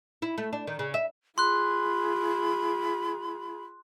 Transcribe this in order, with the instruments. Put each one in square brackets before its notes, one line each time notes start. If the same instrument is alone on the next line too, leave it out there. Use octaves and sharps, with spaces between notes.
[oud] E4
A3
D4
D#3
C#3
E5
[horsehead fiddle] F4 G#4 [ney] B5 [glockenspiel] C6 F#6